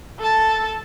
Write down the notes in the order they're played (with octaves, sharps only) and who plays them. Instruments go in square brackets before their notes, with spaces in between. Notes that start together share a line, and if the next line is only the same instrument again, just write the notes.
[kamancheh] A4 A5